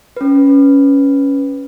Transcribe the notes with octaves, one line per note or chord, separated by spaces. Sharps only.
C#4 B4